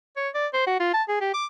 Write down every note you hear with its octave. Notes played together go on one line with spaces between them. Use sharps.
C#5
D5
C5
F#4
F4
A5
G#4
G4
D6